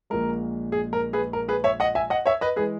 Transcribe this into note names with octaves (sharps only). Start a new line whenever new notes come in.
A#1 A#2 G#3 A#4
G#4
A#4
G#4 B4
A#4
G#4 B4
C#5 E5
D#5 F#5
E5 G#5
D#5 F#5
C#5 E5
B4 D#5
E3 G#3 G#4 B4